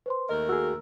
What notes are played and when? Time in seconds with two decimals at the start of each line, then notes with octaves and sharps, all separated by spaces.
0.06 B4 C5 C6
0.29 D#2 A3 A#4 D#5
0.49 F#4 G#4 E6